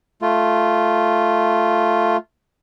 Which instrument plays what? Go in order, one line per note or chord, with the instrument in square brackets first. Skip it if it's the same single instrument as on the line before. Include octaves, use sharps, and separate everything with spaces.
[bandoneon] A3 F4